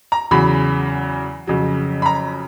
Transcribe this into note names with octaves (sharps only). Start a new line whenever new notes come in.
A#5
E2 C#3 F#3 B5
F2 C#3 F#3
B5
A#5